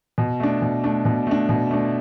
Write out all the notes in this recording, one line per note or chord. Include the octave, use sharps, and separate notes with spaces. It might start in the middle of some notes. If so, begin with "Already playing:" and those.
B2
A3 D4
B2
A3 D4
B2
A3 D4
B2
A3 D4